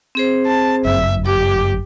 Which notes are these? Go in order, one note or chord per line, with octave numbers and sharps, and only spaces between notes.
C4 G#4 C5
A5
G1 F#2 E5
G4 D6